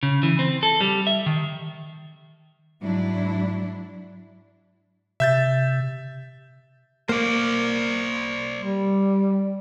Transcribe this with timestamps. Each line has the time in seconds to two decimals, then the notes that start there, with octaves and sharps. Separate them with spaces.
0.03 C#3
0.23 E3
0.39 C4
0.63 A4
0.81 G3
1.07 E5
1.26 D#3
2.81 G#2 F#3 D4 E4
5.20 C3 E5 G6 A6
7.09 A#3 C5 D5
8.59 G3